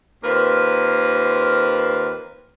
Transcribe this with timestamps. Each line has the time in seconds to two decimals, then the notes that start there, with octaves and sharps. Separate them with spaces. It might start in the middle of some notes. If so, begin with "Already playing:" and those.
0.24 D#2 C4 F4 A#4 B4